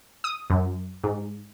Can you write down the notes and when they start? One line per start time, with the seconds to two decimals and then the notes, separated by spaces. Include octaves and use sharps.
0.24 D#6
0.50 F#2
1.04 G#2